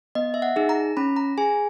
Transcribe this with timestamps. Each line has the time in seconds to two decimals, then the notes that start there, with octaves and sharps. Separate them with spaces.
0.15 B3 D#5
0.34 E5
0.42 F#5
0.56 D#4 G#4
0.69 A#5
0.97 C#4 B5
1.16 A#5
1.38 G#4 G#5